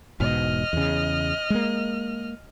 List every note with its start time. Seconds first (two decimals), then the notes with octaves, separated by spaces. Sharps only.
0.20 E1 G#2 B2 D#5 F6
0.73 E2 C#3
1.50 G#3 A#3